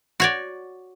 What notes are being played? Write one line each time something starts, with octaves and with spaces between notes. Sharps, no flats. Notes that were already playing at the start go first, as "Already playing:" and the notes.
F#4 C#5 D5